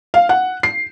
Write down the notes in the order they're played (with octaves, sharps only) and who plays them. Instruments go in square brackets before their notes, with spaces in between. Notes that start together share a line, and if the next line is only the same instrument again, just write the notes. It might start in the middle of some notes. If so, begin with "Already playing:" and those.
[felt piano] F5
F#5
C7